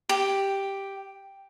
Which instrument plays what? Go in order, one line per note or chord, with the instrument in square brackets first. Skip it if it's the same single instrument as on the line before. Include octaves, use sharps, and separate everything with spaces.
[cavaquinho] G4